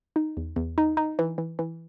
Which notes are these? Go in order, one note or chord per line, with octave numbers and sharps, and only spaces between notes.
D#4
E2
E2
D#4
D#4
E3
E3
E3